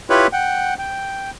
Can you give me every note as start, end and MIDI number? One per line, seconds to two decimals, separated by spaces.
0.10 0.27 64
0.10 0.27 65
0.10 0.27 67
0.10 0.27 71
0.10 0.27 73
0.10 0.27 83
0.33 0.74 78
0.33 0.74 79
0.79 1.31 79